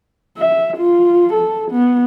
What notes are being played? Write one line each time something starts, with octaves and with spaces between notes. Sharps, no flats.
E5
F4
A4
B3